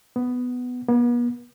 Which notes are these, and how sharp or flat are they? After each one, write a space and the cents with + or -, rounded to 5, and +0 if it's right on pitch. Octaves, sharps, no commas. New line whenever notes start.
B3 +10
B3 -40